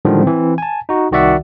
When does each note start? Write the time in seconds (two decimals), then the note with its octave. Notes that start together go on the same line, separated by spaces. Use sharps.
0.05 A2 D3 D#3 F3 G3 G#3
0.22 E3 C4
0.58 G#5 A5
0.89 D#4 F#4
1.11 C2 D#3 F#4 D5 E5 F#5